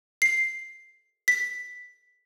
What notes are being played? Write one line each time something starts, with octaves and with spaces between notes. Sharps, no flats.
C7
B6